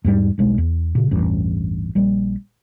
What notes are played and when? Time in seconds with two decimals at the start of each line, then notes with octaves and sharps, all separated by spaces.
0.04 E2 G#2 G3
0.38 D#1 B1 G#3
0.58 E2
0.95 A#2 C#3
1.11 A1 E2 G2
1.95 A#1 G3